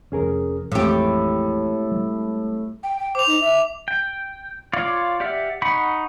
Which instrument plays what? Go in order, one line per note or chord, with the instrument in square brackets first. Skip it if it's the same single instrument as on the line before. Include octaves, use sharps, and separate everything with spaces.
[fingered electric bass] F1 F2 [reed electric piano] C#4 G#4 A#4
[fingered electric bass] A1 F2 [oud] A2 G4 [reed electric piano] G#3 A3 C4
[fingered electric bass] G3
[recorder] G5
G5
[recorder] C5 [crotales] D6 F7
[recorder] D#4
E5
[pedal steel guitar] G5
F4 C#5 D5 F5
G4 D5 E5 F#5 F6
D#4 F#5 B5 C#6